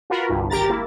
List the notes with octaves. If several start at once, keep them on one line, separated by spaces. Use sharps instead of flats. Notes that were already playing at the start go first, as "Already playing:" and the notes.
F4 F#4 A#4 B4 B5
G1 C2 G2
G#1 G4 A#4 A#5 A6
A#3 E4